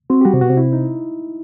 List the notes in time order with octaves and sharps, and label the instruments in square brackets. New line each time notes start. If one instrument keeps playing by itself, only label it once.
[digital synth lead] C4 [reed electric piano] F#4
[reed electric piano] G4
[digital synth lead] G3 [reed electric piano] F#4
[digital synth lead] C3
[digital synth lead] B2 [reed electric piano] F#4
[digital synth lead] C3
[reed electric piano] E4
D#4